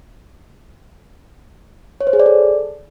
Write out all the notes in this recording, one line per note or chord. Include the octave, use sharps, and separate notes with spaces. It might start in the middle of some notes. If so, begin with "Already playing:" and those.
C#5
C5
G#4
D5
A4